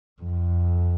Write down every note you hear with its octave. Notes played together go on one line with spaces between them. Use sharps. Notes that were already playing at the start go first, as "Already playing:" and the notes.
F2